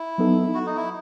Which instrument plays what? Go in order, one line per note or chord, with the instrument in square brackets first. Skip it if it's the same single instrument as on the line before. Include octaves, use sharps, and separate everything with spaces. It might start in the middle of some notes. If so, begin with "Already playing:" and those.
Already playing: [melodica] E4
[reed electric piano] F#3 B3 D#4 A4
[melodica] F#4
D#4
E4